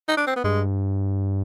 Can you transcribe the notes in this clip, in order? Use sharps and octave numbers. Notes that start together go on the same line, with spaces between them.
D#4
D4
C4
B3
G2 G#3